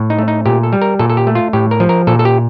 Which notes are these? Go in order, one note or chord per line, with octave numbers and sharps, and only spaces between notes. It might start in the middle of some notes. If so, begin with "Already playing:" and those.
Already playing: A2
D#4
A3
D#4
A#2 G4
A4
G3
A#4
A#2 A4
A4
G4
A3
F4
A2 G4
A#4
F3
A#4
A#2 A4
A4
G4